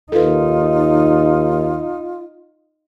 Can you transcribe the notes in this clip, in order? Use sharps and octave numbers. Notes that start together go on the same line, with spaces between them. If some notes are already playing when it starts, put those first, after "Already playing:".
D#2 D#4 F4 A4 B4